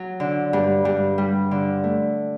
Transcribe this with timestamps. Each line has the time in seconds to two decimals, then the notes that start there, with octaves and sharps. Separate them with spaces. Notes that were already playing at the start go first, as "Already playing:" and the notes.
Already playing: F#3
0.20 D3
0.53 G2
0.85 G2
1.18 G3
1.51 D3
1.84 A3